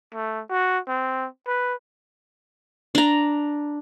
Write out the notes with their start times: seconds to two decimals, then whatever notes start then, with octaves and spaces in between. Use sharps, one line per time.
0.15 A3
0.50 F#4
0.88 C4
1.47 B4
2.95 D4 A#5